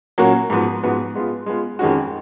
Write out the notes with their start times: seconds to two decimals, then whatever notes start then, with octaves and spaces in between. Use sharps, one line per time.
0.18 A#2 F#3 A#3 C#4 F#4
0.50 G#2 F3 B3 F#4 B4
0.83 G#2 F3 B3 F#4 B4
1.15 G#3 B3 F4
1.46 G#3 B3 F4
1.79 F2 D#3 G#3 C#4 F#4